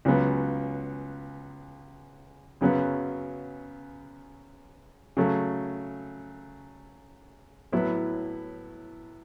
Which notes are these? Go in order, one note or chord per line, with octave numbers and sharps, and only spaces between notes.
C#2 C#3 F#3 B3
F#2 C#3 F#3 B3
C#3 F#3 A3
A2 F#3 B3 E4